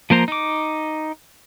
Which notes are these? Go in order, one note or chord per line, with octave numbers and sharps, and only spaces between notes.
F3 A#3 C5 A#5
D#4 D6